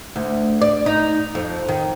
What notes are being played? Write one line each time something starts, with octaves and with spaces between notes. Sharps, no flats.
D2
D5
D#4
F2
D#3